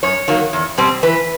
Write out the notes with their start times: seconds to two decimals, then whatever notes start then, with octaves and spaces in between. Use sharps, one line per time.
0.03 F#2 C#5
0.28 D#3 F#3 A#3
0.53 E2
0.78 B2 G3 C4
1.03 E3 B4